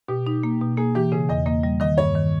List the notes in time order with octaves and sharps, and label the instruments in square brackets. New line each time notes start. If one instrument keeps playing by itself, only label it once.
[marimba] B2 [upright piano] G4
[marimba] D#4
A#3
B2
[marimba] A#3 [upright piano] G#4
[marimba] E3 [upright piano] G4
[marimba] C#3 [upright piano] G#4
[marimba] E2 [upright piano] D#5
[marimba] A#3 [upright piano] D#5
[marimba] G3
[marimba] D#3 [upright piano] D#5
[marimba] G2 [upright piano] C#5
[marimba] D#3